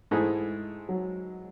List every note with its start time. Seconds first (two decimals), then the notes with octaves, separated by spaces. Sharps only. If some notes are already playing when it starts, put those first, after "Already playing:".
0.11 G#2 E3 G#3 A3 E4 G#4
0.89 F#3